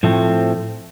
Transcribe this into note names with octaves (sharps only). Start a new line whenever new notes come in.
A2 F3 A3 C4